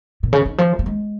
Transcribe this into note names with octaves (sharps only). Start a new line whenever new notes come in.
A#2
C#3
D#3
F3
A#3
G#3